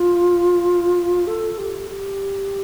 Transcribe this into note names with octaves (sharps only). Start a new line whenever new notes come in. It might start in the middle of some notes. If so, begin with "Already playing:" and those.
Already playing: F4
A4
G4
G4